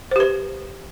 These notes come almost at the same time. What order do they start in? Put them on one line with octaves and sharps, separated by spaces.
C5 G4 B4